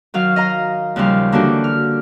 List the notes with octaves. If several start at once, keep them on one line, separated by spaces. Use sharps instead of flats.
D#3 F#3 F5 F6
D#5 F5 A#5
D#2 C#3 F3 G3 F5
D3 E3 A#3 D4 F#4 G4
F6